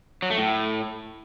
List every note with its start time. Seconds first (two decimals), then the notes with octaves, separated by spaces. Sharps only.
0.22 F#3
0.30 A3
0.38 A2